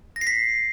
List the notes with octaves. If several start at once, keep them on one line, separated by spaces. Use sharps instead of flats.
A#6
C7
B6